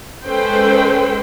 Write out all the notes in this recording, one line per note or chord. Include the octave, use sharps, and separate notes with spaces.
G#3 C#4 A4 B4 C5 G5